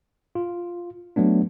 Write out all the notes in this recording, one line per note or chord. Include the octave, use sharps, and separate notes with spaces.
F4
F#3 A3 B3 D4